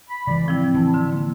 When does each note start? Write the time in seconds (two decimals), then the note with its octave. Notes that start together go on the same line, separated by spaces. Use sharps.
0.10 B5
0.27 C#3 E3 G#3 D5
0.46 A2 F3 C4 E4
0.74 E3 A5 E6
0.94 D3 C6
1.12 A#3